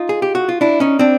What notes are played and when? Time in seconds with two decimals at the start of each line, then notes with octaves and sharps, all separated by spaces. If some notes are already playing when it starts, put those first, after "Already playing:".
Already playing: D#4 F4
0.09 G#4
0.22 G4
0.35 F#4
0.49 F4
0.61 D4 E4
0.80 C#4 D#4
0.99 C4 D4